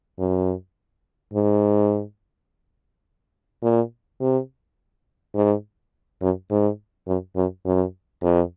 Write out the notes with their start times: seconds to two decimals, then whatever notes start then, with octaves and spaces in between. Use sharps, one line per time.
0.19 F#2
1.34 G#2
3.63 A#2
4.20 C3
5.35 G#2
6.22 F#2
6.51 G#2
7.07 F#2
7.36 F#2
7.66 F#2
8.23 F2